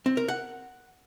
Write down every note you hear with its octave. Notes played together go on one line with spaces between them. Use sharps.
C4
A#4
F#5